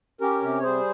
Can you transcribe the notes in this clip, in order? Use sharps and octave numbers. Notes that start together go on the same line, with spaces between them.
C#4 G4 A#4
C3
C#5
G3 G#4 C5